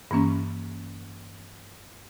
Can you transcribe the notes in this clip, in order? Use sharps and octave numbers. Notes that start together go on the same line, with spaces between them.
G2 E3 A#3 C#4 C#6